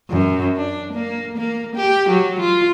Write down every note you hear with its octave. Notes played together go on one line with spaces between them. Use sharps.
F#2
D4
A#3
A#3
G4
F#3
F4